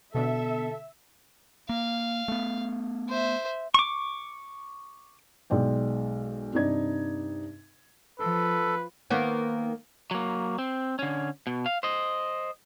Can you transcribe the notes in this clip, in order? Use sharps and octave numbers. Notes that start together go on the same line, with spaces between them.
B2 D3 B3 A4 E5
A#3 F5
A3 B3
C5 E5
C#6 D6
B1 G#3 D5 G5
G2 C3 D#4 D5 G#6
F3 A4 B4
D#3 A#3 B3
F#3 A#3
C4
D3 C#4
B2
F5
C5 D#5